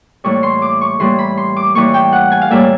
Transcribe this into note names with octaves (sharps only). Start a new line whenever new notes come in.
A2 E3 G3 A#3 C#6
C6
D6
C#6
A2 E3 G3 A#3 C6
B5
C6
D6
A2 E3 G3 A#3 C#6
G5
F#5
G#5
F5
A2 E3 G3 A#3 E5